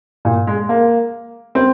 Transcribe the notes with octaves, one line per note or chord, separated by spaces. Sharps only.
A#2
G#3
A#3
C4